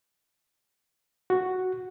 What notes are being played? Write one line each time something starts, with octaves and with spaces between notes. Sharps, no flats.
F#4